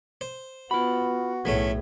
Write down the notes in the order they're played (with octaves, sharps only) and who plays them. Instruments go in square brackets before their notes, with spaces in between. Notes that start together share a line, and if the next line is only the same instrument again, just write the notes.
[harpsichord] C5
[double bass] B3 [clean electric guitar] F4 B5 [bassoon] F#4
[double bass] B1 A2 [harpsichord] E3 A3 C#4 [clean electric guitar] G#4